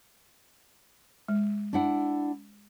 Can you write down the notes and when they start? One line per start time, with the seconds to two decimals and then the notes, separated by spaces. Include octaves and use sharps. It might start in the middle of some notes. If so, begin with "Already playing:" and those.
1.28 G#3
1.73 D4 E4 F#5